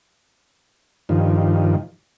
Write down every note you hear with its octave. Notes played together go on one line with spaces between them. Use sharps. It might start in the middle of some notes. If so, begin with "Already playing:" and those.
G2 D#3 F3